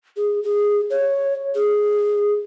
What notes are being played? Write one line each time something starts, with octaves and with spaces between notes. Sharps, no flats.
G#4
G#4
C#5
G#4